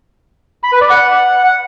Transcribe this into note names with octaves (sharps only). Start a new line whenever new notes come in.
B5
B4
D5
F#5